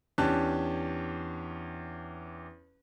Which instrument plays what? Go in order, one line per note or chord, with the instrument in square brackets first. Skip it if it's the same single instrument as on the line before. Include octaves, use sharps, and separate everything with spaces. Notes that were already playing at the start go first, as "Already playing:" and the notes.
[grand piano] E2 C#4 D4 G4 A5 F#6